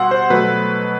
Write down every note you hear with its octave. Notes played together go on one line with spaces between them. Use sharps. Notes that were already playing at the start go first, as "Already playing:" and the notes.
Already playing: B2 G3 F#5 C6 E6
C5
B2 F#3 A3 B4